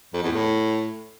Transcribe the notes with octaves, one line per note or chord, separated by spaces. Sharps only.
F2
E2
A2